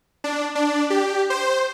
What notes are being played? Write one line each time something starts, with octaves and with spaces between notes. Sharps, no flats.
D4
D4
G4
C5